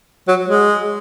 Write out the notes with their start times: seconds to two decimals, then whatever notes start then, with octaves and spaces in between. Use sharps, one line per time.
0.28 F#3
0.49 G#3